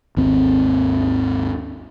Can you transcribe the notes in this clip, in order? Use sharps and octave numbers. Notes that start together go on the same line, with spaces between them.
G#1 D#2 C4